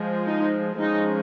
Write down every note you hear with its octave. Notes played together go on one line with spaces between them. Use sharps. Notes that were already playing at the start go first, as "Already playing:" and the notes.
Already playing: F3 G#3
D#4
F3 G#3 C#4 D#4